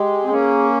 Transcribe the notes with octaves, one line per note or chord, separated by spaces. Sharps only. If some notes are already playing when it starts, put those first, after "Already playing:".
Already playing: G#3 G4
C4
A#3 C#4 G#4